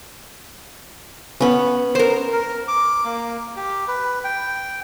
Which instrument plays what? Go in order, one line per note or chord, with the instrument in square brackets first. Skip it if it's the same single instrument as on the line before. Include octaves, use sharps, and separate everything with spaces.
[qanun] B3 C#4
[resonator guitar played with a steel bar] A#4 C5
[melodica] A#4
D6
A#3
G4
B4
G5